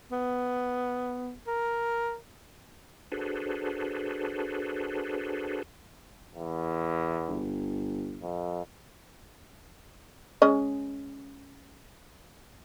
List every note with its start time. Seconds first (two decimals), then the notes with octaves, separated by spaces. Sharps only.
0.12 B3
1.47 A#4
3.12 D4 F#4 G#4 A4 B4 C5
6.35 E2
7.28 G1
8.22 F2
10.42 G#3 C#4 D#5